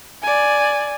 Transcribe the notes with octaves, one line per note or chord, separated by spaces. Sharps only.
D5 G#5